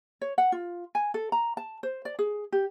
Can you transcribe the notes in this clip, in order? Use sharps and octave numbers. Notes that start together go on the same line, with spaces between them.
C#5
F#5
F4
G#5
A4
A#5
A5
C5
D5
G#4
G4